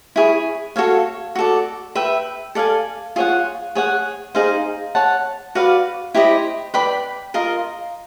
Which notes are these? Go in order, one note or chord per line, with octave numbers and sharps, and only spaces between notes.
E4 G#4 C#5
F#4 A4 C#5 F5
F#4 A4 D5
B4 E5 G5
A4 D5 F5 G#5
F4 G#4 C#5 F#5
G#4 C#5 F#5
D#4 G#4 C5 F5
C#5 F#5 A5
F#4 B4 D5 F5
E4 G4 C5 D#5
B4 D5 G5 B5
F4 A#4 D#5